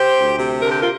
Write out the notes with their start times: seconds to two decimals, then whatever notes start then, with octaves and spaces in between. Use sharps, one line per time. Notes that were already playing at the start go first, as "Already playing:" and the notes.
Already playing: G4 C5
0.16 D2
0.39 C3
0.61 D3 A#4
0.71 G4
0.81 F4 A#4